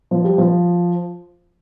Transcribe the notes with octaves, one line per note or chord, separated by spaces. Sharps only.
F3
G3
F3